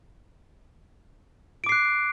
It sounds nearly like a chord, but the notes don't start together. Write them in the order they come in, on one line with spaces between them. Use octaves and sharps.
D7 D6 C7 F#6